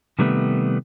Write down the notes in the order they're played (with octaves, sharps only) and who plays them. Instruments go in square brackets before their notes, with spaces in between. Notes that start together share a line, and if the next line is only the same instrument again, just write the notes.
[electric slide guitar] C3 D#3 G3 A3 B3